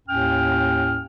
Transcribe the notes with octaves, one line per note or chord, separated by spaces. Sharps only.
D#2 A2 C#4 G5 F6